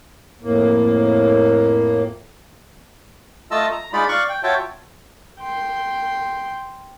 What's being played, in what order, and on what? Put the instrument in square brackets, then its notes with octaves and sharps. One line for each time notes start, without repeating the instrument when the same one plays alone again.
[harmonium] F2 A2 A#3
[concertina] A3 F4 D#5 A5 E6
A#5
G#3 D#4 F4 D5 B5
D5 F5 C#6 F#6
G5
F4 F#4 C#5 E5 G5 A5
[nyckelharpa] G5 C6